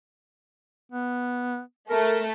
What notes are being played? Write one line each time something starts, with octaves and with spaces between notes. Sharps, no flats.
B3
A3 A#4